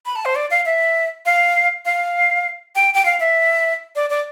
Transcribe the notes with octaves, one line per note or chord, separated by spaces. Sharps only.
B5
A5
C5
D5
F5
E5
F5
F5
G5
G5
F5
E5
D5
D5